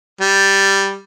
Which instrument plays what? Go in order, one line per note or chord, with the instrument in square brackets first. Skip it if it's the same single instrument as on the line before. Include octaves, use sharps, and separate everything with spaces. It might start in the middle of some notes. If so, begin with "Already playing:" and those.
[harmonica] G3